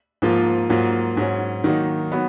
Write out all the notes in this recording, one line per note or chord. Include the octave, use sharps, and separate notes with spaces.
G#2 F3 A#3 F4
G#2 F#3 A#3 F4
G#2 F#3 C#4
D#3 F#3 A#3 D#4
F#3 B3